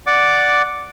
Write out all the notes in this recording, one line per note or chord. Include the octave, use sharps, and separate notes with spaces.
D5 F#5 D6